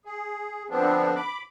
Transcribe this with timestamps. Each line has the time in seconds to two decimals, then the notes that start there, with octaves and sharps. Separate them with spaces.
0.05 G#4
0.70 F2 D3 F3 B3 C4 D4
1.16 B5 D6